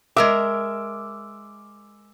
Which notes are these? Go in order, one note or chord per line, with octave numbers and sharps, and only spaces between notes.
G#3 A#4 E5 D6 E6